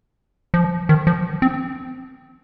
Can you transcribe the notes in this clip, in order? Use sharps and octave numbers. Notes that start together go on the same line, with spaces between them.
F3
D#3
F3
C4